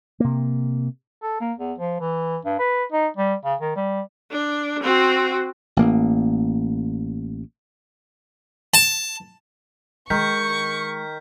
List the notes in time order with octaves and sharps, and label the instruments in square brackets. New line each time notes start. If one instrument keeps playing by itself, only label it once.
[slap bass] C3 A#3
[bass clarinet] A4
A#3
E2
F3
E3
G2
B4
D#4
G3
C#3
D#3
G3
[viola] D4
C4 F#4
[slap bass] A1 A#3
[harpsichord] A5
[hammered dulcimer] D#3 [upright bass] G#3 [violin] C#6 [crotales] F6 G6 B6